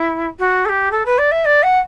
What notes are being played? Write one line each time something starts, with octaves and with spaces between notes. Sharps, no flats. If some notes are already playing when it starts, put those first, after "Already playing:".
Already playing: E4
F#4
A4
G4
A4
B4
D5
E5
D5
F#5